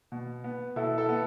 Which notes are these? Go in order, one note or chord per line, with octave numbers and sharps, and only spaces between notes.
B2
B3
B2 E4 A4
E4 A4
B3